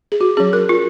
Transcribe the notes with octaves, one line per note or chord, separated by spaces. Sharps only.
G#4
F#4
F#3 C#4 G#4
A#4
F4